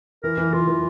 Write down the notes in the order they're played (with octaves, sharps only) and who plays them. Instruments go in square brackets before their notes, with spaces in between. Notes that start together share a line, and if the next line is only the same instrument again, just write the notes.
[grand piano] E3 [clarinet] A#4
[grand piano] E3
[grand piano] E3 [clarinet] F4
[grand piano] E3